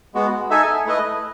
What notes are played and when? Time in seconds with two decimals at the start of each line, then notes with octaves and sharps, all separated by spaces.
0.14 G#3 B3 F#4
0.50 D#4 A4 E5 G#5
0.85 A3 E4 B4 D#5